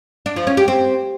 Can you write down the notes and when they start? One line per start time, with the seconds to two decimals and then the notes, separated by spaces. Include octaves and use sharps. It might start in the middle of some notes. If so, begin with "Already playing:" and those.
0.26 D4
0.36 F3
0.47 C#4
0.57 G4
0.68 C4